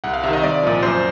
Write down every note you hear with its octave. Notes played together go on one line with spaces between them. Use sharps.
C2 F#5
F5
C3 D#3 E5
D#5
C2 D5
A#2 F3
F#2 C5